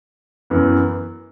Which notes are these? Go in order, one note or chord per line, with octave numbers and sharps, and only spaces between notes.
F#2 E3 B3